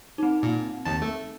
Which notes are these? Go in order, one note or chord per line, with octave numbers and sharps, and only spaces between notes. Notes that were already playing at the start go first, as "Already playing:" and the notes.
C4 D#4
A#2
D#2 A5
A3